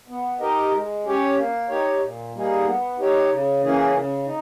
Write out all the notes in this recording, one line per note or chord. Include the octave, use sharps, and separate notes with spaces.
B3
D#4 G4 A#4 D#5
G#3
C#4 G4 C#5
A#3
D#4 G4 C#5
A#2
G3 A#3 D#4 G#4
B3
D#4 G4 C#5
C#3
E3 A#3 C#4 G#4
C#3
D#4